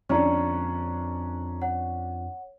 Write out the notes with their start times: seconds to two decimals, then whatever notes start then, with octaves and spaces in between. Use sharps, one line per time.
0.09 F2 D3 C#4 D4 A5 A#5 C#6
1.62 C#5 F#5